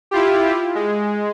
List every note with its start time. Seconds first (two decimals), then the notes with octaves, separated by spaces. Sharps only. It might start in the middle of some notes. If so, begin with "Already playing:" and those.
0.11 E4 F4 G4
0.75 G#3